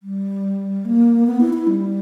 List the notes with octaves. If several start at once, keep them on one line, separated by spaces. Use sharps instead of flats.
G3
A#3
B3
E4
E4
G3